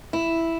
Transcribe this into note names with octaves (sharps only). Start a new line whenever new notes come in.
E4